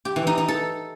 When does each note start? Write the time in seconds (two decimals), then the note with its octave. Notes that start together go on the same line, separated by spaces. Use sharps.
0.05 G4
0.16 E3
0.27 D#4
0.38 D#4
0.48 A4